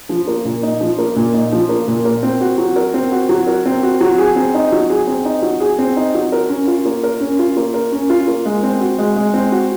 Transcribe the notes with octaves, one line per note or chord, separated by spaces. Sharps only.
F3
A#3
A#2
D#4
F3
A#3
A#2
D#4
F3
A#3
A#2
A#4
C4
F#4
F#3
A#4
C4
F#4
F#3
A#4
C4
F#4
F#3
G#4
C4
D#4
F#3
G#4
C4
D#4
F#3
G#4
C4
D#4
F#3
A#4
C#4
F4
A#3
A#4
C#4
F4
A#3
A#4
C#4
F4
A#3
G#3
C4
F#4
G#3
G#3
C4
F#4